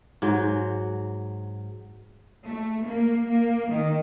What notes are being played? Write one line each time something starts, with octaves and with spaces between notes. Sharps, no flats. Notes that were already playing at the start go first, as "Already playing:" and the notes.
G#2 F#3
A3
A#3
A#3
D#3